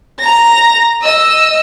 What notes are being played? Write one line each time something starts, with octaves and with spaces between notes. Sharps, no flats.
A#5 A#6
D#5 E6